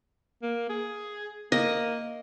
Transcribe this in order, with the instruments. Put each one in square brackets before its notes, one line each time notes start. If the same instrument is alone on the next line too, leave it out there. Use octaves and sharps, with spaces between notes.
[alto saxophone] A#3
G#4
[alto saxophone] A#3 [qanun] D#5